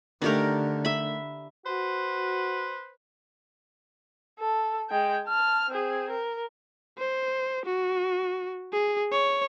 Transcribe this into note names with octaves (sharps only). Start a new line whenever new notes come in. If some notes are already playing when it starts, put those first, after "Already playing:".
D3 D#3 A3 D4 G4 A#4
E5 B5
F#4 B4 C5
A4
G#3 G5
A5 F6
C4 G#4
A#4
C5
F#4
G#4
C#5